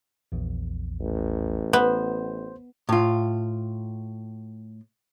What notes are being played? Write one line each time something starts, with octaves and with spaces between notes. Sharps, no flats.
A#1 E2
A1
B3 C5
A2 F4